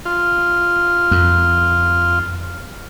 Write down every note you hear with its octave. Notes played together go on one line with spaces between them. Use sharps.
F4
F2